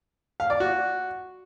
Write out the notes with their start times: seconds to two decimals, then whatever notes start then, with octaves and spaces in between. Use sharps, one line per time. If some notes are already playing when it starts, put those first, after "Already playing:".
0.40 F5
0.50 D5
0.60 F#4